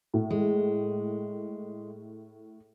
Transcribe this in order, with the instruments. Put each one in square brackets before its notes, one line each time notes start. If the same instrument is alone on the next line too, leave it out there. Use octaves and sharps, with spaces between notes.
[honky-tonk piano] A2
[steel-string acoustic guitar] G#3